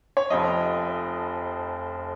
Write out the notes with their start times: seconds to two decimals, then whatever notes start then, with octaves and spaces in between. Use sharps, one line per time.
0.17 C#5
0.30 F1 F2 F3 D#5